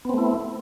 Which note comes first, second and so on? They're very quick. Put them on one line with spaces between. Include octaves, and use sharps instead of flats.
B3 C4 A3 E4